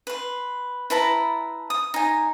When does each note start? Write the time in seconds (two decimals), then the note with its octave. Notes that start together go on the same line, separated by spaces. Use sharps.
0.07 B4 C6
0.90 E4 B4 A5 A#5
1.70 D#6
1.94 D#4 G#5